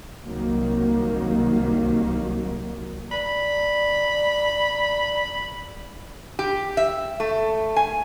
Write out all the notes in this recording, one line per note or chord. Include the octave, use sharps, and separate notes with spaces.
C2 D#3 F#3 A#3
D5 B5
G4
E5
A3
G#5